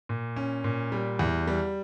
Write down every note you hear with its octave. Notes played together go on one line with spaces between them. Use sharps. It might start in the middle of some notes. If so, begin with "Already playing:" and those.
A#2
C#4
A#2
G3
E2
G3